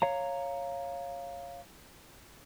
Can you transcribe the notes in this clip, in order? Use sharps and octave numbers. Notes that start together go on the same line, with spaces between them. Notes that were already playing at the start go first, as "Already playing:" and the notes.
C#5 F5 A#5